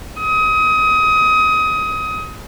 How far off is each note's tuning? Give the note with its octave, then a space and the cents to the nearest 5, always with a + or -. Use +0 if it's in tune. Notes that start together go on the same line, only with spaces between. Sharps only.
D#6 +25